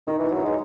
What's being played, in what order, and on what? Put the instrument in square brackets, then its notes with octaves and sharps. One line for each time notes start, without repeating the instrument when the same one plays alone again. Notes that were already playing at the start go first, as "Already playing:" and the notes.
[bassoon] D#3 [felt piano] D#4
[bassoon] E3 [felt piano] E4
[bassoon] F#3
[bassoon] G#3 [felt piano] D#4